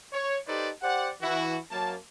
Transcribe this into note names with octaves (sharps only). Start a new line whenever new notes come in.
C#5
D#4 G4 A4 B4 C5 D5
G4 C5 D5 F#5
E3 E4 F#4
F#2 A#3 A5